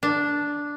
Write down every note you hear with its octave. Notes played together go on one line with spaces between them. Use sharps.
D4